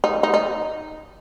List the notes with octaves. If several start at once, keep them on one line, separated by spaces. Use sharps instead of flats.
D#4
D#4
D#4